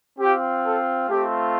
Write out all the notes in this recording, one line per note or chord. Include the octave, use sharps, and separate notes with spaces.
C4 F4 G4
A4
A3 C4 F4 G4